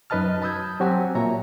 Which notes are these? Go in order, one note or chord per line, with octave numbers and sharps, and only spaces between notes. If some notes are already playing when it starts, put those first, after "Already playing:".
F#2 D#4 B4 D#5 A5 F6
A5 B5 D#6 E6 G6 G#6
F#3 C4 F#4 G4 G#5
A#2 C#5 E5 A#5